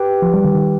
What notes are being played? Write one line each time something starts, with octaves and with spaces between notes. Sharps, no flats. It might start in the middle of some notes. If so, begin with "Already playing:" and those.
Already playing: G4 B4 G5
F3
G3
D#3
D#3